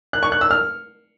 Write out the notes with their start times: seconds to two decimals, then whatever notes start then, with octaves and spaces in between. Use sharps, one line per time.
0.13 F#6
0.23 C#6
0.32 F#6
0.41 E6
0.51 F6